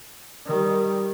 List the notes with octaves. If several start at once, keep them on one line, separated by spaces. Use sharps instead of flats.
D#3 G3